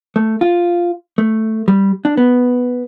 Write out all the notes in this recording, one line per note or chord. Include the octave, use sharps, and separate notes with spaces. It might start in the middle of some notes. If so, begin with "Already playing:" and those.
A3
F4
A3
G3
D4
B3